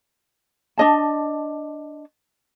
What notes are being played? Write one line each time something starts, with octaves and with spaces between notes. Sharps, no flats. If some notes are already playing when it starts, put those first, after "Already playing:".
D4 D#5 A5